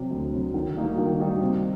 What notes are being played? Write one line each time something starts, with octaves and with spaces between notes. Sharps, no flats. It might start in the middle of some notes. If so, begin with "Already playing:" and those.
Already playing: C3 F#3
D2
C3 F#3
D#3
G3 A#3 D#4 F#4
D#3
G3 A#3 D#4 F#4
C3